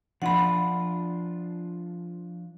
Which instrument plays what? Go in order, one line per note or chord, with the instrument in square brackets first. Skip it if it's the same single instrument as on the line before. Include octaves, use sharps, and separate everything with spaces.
[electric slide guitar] F3 D4 F4 [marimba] F#5 B5